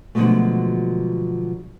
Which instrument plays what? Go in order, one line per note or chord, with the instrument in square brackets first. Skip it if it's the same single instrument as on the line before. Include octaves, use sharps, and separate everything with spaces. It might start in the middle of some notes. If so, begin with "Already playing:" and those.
[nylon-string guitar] B2 D3 F3 F#3 G#3 A3